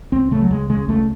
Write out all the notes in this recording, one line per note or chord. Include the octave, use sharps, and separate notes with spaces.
C#2 C4
C#3 A3
F#3
C#2 G#3
C#3 G#3
C#2 A3